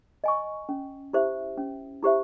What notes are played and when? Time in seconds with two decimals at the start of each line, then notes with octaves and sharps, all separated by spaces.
0.24 D#5 G#5 C#6
0.69 C#4
1.13 E4 G4 C5 E5
1.58 C#4
2.03 E4 G4 C5 E5